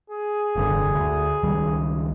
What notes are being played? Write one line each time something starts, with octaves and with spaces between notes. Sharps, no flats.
G#4
F1 G2 D3
D2
C#2 D#3 G3